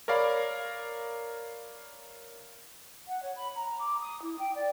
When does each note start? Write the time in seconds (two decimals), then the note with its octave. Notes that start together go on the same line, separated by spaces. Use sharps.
0.08 A#4 C#5 D5 F5 A#5 B5
3.08 F#5
3.23 C#5
3.36 B5
3.56 A#5
3.78 D6
4.01 D#6
4.23 E4
4.38 G5
4.55 D5